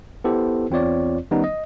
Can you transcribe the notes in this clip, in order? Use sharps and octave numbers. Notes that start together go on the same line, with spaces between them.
B3 E4 G4 A4 C5
E2 C4 F4 C#5 D5
D#3 G3 B3 C#4 D#4
D#5